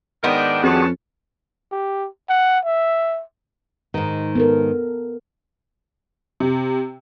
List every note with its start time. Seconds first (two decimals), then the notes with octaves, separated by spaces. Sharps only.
0.24 G#2 D#3 B3 D4 A#4 G5
0.63 F2 C4 C#4 F#4 G#4 B4 A5
1.72 G4
2.29 F#5
2.65 E5
3.94 G#2 D#3
4.35 B3 A4 A#4
6.40 C3